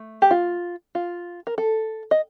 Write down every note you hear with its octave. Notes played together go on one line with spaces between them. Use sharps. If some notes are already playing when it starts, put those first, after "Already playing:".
Already playing: A3
G4
F4
F4
A#4
A4
D#5